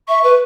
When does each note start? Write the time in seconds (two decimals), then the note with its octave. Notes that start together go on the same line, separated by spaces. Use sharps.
0.08 E5 C#6
0.24 B4